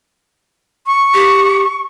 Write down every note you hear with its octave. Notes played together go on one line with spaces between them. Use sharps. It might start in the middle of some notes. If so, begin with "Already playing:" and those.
C#6
G4